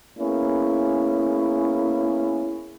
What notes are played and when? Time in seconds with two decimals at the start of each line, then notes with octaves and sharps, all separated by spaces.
0.18 A#3 B3 C#4 E4 G#4